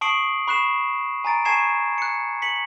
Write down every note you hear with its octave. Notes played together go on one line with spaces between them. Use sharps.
A5 C#6 D#6 C7 D7 F#7
B5 C#6 F#6 C7 E7
G#5 A#5 A6 D7
G#5 A5 C#6 G#6 C7 E7
F#6 C#7
B6 C#7 F#7